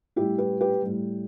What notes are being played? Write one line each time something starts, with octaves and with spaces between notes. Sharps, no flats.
A2 G3 E4 G4
G4 B4
G4 B4
A2 G3